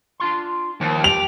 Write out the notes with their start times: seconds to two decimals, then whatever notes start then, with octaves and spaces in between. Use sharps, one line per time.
0.20 D4 F4 C6
0.81 D#2 F3
1.04 G4 F7